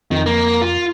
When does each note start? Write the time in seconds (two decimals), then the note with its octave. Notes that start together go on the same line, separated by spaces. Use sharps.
0.11 F2 D#3
0.26 A#3
0.61 F4